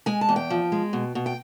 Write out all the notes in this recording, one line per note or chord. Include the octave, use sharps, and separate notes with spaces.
G#3 G#5
A5
E2
G5
F3
G#3
B2
B2
G5